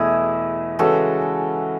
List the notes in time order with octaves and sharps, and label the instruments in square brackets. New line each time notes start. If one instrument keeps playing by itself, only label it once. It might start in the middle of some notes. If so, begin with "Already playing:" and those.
Already playing: [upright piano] E2 B2 A3 [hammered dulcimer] E4 G#4
[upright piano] C#3 E3 G#3 C#4 [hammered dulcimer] F#4 A4